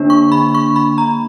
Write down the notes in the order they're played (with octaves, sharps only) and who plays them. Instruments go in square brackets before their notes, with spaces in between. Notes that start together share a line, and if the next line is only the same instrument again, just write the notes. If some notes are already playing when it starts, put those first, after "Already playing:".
Already playing: [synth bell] D3 A#3 D4
C#6
B5
C#6
B5
A#5